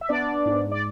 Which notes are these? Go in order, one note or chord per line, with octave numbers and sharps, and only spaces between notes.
E5
B3 D4 D5
G#2
D5